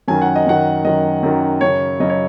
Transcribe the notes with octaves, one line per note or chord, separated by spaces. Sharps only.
F#2 D#3 G#5
F#5
D#5
F#2 D#3 F#5
F#2 D#3 D#5
F#2 D#3
F#2 C#3 C#5
F#2 C#3 D#5
C#5